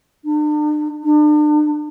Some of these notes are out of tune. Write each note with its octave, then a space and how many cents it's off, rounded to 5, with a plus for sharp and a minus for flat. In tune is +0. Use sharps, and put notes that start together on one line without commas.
D4 +45
D4 +40